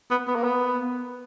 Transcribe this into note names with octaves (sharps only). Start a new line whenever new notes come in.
B3
B3
A#3
B3